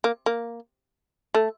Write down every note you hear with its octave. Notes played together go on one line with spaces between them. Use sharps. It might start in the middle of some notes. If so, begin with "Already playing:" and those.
A#3
A#3
A3